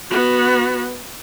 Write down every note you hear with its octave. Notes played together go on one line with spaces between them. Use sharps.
B3 F#4